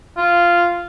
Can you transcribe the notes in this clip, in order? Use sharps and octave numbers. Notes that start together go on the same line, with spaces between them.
F4